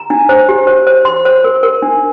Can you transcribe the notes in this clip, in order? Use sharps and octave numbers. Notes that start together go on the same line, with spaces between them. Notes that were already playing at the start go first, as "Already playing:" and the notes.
Already playing: A#5
D4
C5
G4
C5
C5
C6
C5
A#4
A#4
D4